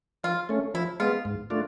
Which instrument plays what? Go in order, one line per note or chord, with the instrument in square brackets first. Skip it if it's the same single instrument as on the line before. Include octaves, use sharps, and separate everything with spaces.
[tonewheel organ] F3 [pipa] F4
[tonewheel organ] A3 C#4
[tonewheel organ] F3 [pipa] E4
[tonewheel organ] G#3 B3 [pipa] F4
[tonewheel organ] G#2
A3 D4 F4